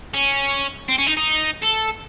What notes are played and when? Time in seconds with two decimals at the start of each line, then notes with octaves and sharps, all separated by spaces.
0.14 C#4
0.89 C4
0.98 C#4
1.07 D#4
1.17 D#4
1.63 A4